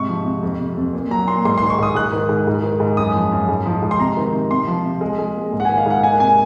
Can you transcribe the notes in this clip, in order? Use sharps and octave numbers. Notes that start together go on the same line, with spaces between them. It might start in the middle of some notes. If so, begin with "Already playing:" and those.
Already playing: G#2 C3 C#6
F3
C3
F2
C3
F2
A#2
F#3 A#5
A#2 C6
G#2 C6
D#3 C6
C#6
G#2 D#6
G#2 F#6
D#3
G#2
G#2
D#3
G#2
F#2 D#6
F3
F#2
G#2
F3
G#2
C6
C3 A#5
D#3
C3
C3 C6
F3
C3
G#3
G#3
A#2
G#2
F#5
D#3 G#5
F5
G#2 F#5
A#3 G#5
C3 G#5